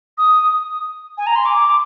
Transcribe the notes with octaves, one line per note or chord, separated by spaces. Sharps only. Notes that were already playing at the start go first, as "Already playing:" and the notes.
D#6
G#5
A#5
C6
D6